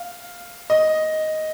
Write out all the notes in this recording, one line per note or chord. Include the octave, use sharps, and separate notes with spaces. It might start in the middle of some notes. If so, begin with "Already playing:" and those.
Already playing: F5
D#5